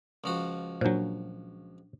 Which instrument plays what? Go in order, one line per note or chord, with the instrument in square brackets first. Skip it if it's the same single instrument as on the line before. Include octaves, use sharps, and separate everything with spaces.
[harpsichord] C#2 F3 F#4
[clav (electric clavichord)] A#2 F#3 [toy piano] D4 C5